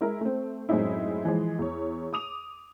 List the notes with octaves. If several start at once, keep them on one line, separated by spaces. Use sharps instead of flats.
G#3 E4 A#4
A3 C4
F#2 A2 G#3 C4 D#4 E4
E3 F3 G#3
E2 C#5
D6 D#6 F7